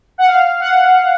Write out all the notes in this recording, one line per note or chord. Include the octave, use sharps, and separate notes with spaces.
F#5
F5
F#5